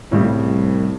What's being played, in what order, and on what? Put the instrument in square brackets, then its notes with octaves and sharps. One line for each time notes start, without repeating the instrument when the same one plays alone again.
[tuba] C2 [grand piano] A2 C#3 G3